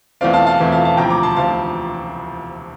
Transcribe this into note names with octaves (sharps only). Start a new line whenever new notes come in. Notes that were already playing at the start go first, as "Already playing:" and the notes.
E1 E2 E3 A3 C4 D5 F5
F5 A5
F5 A5
E1 E2 E3 A3 C4
F5 A5
F5 A5
E1 D2 C3 F3 C4 G5 A#5
A#5 D6
A5 C6
E1 D2 C3 F3 C4 F5 A5